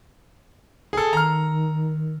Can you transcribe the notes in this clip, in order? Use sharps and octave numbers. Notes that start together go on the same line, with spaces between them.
G#4 A4
D#3 A#5 F6